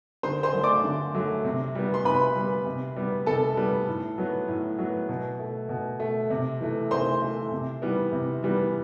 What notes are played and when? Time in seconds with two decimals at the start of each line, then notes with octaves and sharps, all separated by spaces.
0.23 D3 C5 C6
0.43 C5 C6
0.53 F#3 A3
0.63 D5 D6
0.84 D3
1.14 F#3 A3
1.45 C3
1.75 G3 B3
1.94 C6
2.05 C3 B4 B5
2.36 G3 B3
2.66 C3
2.96 G3 B3
3.26 C3 A4 A5
3.57 G3 B3
3.88 A2
4.18 F#3 B3
4.48 A2
4.79 F#3 B3
5.09 B2
5.39 A3
5.69 B2
6.00 A3
6.30 C3
6.61 E3 A3
6.91 C3 C5 C6
7.22 E3 A3
7.52 C3
7.82 E3 G3 B3
8.12 C3
8.43 E3 G3 B3